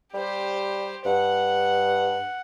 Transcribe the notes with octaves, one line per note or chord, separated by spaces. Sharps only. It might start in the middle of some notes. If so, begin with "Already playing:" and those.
G3 G4 C5
G2 F#5